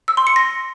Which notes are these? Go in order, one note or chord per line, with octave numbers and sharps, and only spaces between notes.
E6
C6
C#7
A#6